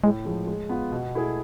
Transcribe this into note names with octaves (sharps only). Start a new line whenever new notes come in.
A2 G#3
F3 G#3
G#3
B3 F4
B2
A3 E4 G#4